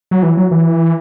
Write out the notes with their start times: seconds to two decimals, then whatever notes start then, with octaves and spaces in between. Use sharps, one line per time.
0.11 F#3
0.23 E3
0.37 F#3
0.51 E3